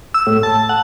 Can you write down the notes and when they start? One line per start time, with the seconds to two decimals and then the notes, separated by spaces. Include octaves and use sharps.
0.14 E6
0.27 A2
0.43 A5
0.69 F#5